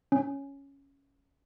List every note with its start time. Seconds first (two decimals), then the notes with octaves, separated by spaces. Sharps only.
0.12 C#4